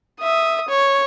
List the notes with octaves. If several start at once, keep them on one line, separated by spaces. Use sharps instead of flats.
E5 D#6
C#5